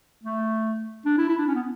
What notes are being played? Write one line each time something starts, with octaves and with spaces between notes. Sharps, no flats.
A3
D4
E4
E4
D4
C#4
B3